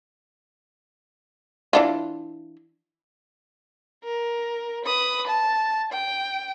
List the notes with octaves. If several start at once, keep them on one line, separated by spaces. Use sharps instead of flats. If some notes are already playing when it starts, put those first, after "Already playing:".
E3 D4 F4
A#4
B4 D#6
A5
G5